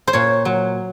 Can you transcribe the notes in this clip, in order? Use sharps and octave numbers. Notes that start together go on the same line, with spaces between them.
C5
A#2 C#5
F#3